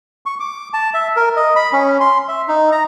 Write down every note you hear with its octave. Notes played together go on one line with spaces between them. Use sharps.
C#6
D6
A5
E5
A#4
D#5
B5
C#4
C6
E5
D#4
A#5